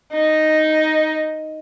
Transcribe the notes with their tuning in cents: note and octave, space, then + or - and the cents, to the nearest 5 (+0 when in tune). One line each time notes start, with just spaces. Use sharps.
D#4 +0